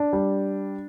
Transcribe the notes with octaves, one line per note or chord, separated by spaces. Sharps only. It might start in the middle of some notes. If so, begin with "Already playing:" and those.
Already playing: D4
G3